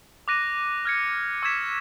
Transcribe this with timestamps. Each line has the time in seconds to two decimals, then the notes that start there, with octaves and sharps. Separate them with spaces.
0.28 D6 F#6 A#6 D#7
0.85 F6 G#6 C#7
1.43 C#6 E6 G#6 B6 E7